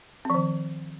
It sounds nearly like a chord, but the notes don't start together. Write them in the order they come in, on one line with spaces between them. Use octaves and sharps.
C4 F3 D#3